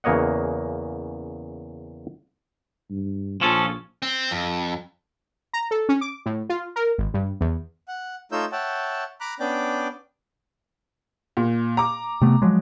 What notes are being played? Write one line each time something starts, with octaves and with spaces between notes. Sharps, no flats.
E2 C#3 A#3 C#5 D#5 F#5
G2
A#1 F3 C#4 A4
C4
F2
A#5
A4
C#4
D6
A2
F4
A#4
G#1
G2
E2
F#5
A3 D#4 F4 C#5 E6 G6
C#5 E5 F#5 G5 A5
A#5 B5 D6 F#6
B3 C#4 D4 D5 G5 D6
A#2
A#5 D6
C3 A3 B3
F3 F#3 G#3